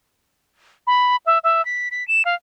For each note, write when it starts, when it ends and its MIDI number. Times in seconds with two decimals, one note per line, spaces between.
0.87 1.16 83
1.26 1.38 76
1.44 1.64 76
1.65 1.88 95
1.91 2.06 95
2.08 2.23 100
2.25 2.34 77